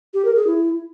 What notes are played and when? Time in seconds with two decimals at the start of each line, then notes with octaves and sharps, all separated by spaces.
0.14 G4
0.25 A#4
0.36 G#4
0.47 E4